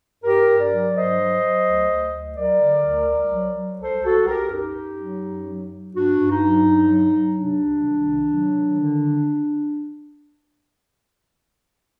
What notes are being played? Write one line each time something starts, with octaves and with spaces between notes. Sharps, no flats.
G2 G4 A#4
G2
A#4 D5
F#3
G2 C5 D#5
F#3
F#3
D2
D2
D2
F#3 A#4 D5
D3
D2
C2
F#3
F#3
C2 A4 C5
C2 F#4 A4
C2 G4 A#4
F#2 D#4 G4
F#2
F#3
F#2
F#3
F#3
G2 D4 F#4
G2
D#4
F#3
G2
F#3
F#3
C3 D4
C2
D#3
C3
F#3
D#3
D3